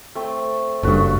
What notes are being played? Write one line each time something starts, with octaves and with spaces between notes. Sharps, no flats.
A3 C4
F#1 G2 A3 F#4